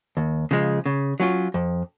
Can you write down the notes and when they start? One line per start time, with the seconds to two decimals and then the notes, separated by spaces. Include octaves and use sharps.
0.17 D#2
0.51 C#3 F3 G#3
0.86 C#3
1.20 F#3 C#4 F4
1.54 F2